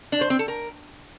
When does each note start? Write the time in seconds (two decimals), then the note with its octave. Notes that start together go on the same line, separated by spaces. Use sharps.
0.12 D4
0.21 C5
0.30 C4
0.39 A4
0.48 A#4